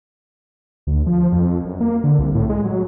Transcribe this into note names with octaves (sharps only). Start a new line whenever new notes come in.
D2
F3
F2
F#2
A#3
D3
C2
A2
G#3
F#3